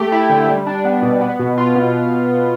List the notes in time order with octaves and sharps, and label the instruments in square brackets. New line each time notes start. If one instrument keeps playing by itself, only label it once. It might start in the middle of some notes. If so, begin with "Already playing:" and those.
Already playing: [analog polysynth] A3 G4
E4
D3
G3
D4
B3
B2
B3
B2
F4
B2